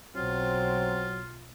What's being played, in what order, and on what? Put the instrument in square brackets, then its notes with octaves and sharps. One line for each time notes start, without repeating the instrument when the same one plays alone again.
[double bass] B1 B2 [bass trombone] F#3 [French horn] C4 [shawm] F4